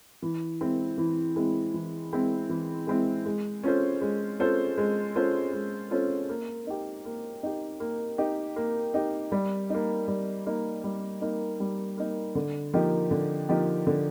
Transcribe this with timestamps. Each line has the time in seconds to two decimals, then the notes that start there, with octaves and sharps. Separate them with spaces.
0.22 E3
0.61 G#3 C4 E4
0.98 E3
1.36 G#3 C4 E4
1.74 E3
2.13 G#3 C4 E4
2.50 E3
2.87 G#3 C4 E4
3.26 G#3
3.64 C#4 F4 A4 C5
4.02 G#3
4.40 C#4 F4 A4 C5
4.78 G#3
5.16 C#4 F4 A4 C5
5.53 G#3
5.91 C#4 F4 A4 C5
6.29 A#3
6.67 D#4 G4
7.05 A#3
7.43 D#4 G4
7.80 A#3
8.18 D#4 G4
8.56 A#3
8.94 D#4 G4
9.32 G3
9.70 A#3 D#4
10.08 G3
10.46 A#3 D#4
10.84 G3
11.22 A#3 D#4
11.60 G3
11.98 A#3 D#4
12.35 D3
12.73 F3 A#3 D#4 G4
13.11 D3
13.49 F3 A#3 D#4 G4
13.87 D3